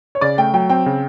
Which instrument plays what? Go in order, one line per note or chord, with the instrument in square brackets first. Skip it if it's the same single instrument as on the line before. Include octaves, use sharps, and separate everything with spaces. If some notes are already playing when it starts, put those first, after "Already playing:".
[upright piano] C#5
[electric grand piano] C#3 [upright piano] D5
[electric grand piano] A3 [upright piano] G5
[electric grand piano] F#3 [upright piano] G5
[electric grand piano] C4 [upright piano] G5
[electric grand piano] C#3